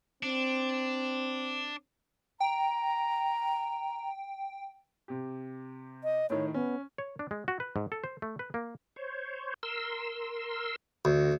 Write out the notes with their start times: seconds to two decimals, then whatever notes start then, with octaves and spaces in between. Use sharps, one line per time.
0.23 C4 D4
2.40 G5 A#5
5.08 C3 G4
6.04 D#5
6.30 A2 D#3 C#5
6.54 B3 C#4
6.98 C#5
7.19 D4
7.31 G#3
7.48 F#4
7.60 B4
7.76 G#2
7.92 A4
8.04 C5
8.22 A3
8.39 B4
8.54 A#3
8.96 C5 C#5
9.63 A#4 C6 E6
11.05 D2 D3 F#4